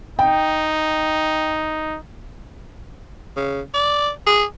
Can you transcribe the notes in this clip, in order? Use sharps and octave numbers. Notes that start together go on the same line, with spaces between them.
D#4 G5
C#3
D5
G#4